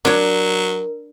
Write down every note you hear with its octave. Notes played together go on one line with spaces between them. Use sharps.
F#3 D4 A#4 C#5